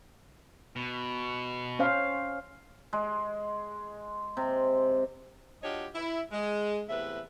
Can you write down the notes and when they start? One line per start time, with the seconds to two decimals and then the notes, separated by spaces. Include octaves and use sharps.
0.76 B2
1.79 C#4 C5 F5
2.93 G#3
4.37 C3
5.63 F#3 D4 F4 G4 C#5 D#5
5.95 E4
6.32 G#3
6.89 E2 A2 C3 B4 E5